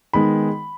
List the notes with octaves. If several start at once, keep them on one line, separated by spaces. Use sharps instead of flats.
D#3 G#3 B3 B5